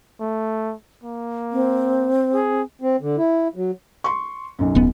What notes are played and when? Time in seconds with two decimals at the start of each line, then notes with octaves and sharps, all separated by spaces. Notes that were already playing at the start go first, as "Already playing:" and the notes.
0.20 A3
1.04 A#3
1.52 C4
2.33 G#4
2.82 C4
3.01 D3
3.17 E4
3.56 F#3
4.04 C6 C#6
4.59 B1 F#2
4.75 D#1 B3